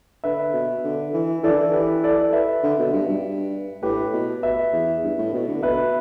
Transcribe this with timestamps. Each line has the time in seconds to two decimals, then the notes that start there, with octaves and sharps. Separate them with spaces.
0.24 D3 B4 E5
0.53 B2
0.84 D3
1.13 E3
1.43 E3 A4 D5
1.51 D3
1.58 E3
1.73 G4 B4
2.04 A4 D5
2.33 B4 E5
2.63 D3
2.79 B2
2.93 G2
3.08 G2
3.83 A2 G4 B4
4.13 B2
4.43 B4 E5
4.73 E2
5.03 G2
5.19 A2
5.34 B2
5.48 D3
5.63 B2 B4 E5